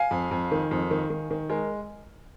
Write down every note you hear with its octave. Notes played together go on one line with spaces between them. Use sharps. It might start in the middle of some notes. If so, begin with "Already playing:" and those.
Already playing: F5 G#5
F2
F2
D#3
F2
D#3
D#3
D#3
G#3 A#4